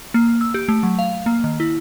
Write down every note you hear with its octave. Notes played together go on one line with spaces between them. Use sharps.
A#3
E6
G4
A3
F#3
F5
A#3
D#3
E4